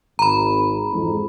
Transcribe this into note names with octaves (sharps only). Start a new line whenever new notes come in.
G#1 A#5 B5
F2 G#2 E3